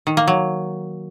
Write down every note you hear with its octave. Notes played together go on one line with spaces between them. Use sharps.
D#3
A#3
F#3